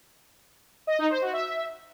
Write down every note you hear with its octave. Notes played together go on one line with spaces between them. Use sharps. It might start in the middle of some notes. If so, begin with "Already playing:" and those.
D#5
D#4
C5
F#4
E5